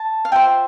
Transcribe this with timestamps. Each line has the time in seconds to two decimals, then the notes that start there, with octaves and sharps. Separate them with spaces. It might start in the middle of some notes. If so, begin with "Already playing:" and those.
Already playing: A5
0.25 F5
0.32 F4 C5 E5 G5